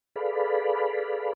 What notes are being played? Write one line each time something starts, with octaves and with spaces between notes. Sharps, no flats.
G#4 A4 B4 D5 F5 B5